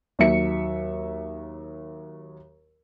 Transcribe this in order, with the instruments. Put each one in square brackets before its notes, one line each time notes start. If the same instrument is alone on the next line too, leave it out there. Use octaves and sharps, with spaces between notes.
[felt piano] D#2 F#3 E5 C#7